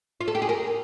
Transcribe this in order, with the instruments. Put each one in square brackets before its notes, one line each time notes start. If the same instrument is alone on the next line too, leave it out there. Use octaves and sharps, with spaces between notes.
[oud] F4
A4
G4
G#4
A#4